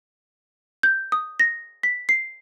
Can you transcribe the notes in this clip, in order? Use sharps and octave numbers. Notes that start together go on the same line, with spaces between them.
G6
D#6
A#6
B6
C7